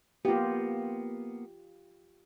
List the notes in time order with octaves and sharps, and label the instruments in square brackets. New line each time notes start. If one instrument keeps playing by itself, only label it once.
[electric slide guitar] A#3 B3 [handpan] F4 G4